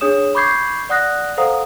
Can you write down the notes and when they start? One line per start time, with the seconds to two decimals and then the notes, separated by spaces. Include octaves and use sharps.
0.01 D4 G#4 C#5 D#6 E7
0.35 B5 C#6 D6 G6 G#6 C7
0.89 D5 F#5 D#6 F#6 A#6
1.37 A4 C5 F5 F#5 A#5 D#6